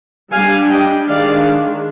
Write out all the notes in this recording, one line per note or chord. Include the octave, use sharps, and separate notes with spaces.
G3 D4 F5 G#5
D#5 G5
D#3 G#3 D4 D5 F5